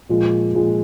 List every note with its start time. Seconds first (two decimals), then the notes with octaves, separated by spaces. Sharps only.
0.09 A#2 F3 G#3
0.54 A#2 F3 G#3